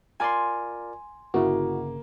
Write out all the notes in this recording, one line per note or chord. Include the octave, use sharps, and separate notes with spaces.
F4 A#4 D5 G#5 C6
G1 C#3 A#3 E4 F#4